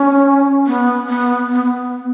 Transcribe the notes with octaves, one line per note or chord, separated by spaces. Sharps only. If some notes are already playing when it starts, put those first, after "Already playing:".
Already playing: C#4
B3
B3
B3